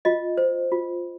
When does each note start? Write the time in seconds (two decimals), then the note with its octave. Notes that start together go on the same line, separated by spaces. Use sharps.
0.05 F4 D#5
0.37 C5
0.72 F4